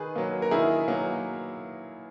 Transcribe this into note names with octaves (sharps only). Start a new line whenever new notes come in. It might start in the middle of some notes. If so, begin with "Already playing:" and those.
Already playing: D#3 G#4 B4
F#3 A#3
A#4
D#3 E4 G#4
F#3 A#3